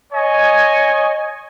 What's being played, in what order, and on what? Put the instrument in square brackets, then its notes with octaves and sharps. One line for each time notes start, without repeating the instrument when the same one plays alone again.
[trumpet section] C#5 D#5 G#5